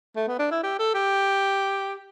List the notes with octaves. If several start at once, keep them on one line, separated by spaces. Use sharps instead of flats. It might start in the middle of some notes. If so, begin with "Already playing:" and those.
A3
B3
D4
E4
G4
A4
G4